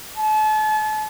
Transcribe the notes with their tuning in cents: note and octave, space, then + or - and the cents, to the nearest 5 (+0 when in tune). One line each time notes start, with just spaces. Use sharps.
A5 -40